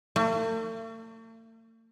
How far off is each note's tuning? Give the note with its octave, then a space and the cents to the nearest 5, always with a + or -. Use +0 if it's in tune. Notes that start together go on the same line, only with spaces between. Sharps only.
A3 +45